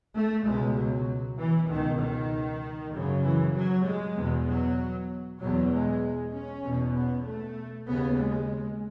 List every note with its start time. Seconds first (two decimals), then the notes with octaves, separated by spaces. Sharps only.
0.14 A3
0.45 C#2 B2 G#3
0.76 F#3
1.37 E3
1.69 C#2 B2 D#3
2.00 D#3
2.92 F#2 C#3
3.23 E3
3.54 F#3
3.85 G#3
4.16 E2 B2
4.47 F#3
5.39 E2 B2 F#3
5.70 G#3
6.32 C#4
6.63 E2 B2
6.94 B3
7.25 A3
7.86 D#2 C#3 B3
8.17 G#3